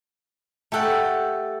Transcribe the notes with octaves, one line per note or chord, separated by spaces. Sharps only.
A3 G4 A4 F#5 G5